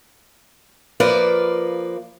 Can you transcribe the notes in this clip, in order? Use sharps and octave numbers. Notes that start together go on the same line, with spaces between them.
F3 A#3 B4 D5